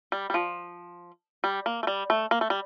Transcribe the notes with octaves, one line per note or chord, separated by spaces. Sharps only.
G3
G3
F3
G3
A#3
A3
G3
A3
A#3
A3
G3